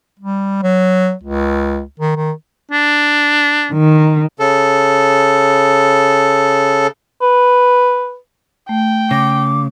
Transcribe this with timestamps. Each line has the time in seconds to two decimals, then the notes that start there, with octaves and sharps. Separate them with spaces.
0.20 G3
0.63 F#3
1.24 C#2
2.00 D#3
2.16 D#3
2.72 D4
3.73 D#3
4.40 C#3 A4
7.22 B4
8.69 A3 G5
9.11 C#3 D6 A#6